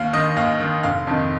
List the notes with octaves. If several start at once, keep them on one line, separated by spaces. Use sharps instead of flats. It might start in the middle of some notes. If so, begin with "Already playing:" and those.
Already playing: D#2 F5
D#3 D#5
D#2 F5
D#3
F1 F5
F2 D#3